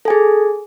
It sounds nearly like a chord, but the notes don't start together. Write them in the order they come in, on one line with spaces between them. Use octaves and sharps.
A4 G#5 G#4